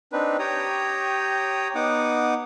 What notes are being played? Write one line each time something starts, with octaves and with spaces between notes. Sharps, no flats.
C4 D4 D#4 B4
G4 C#5 G5 A#5 D#6
B3 D#4 F#5 D6 D#6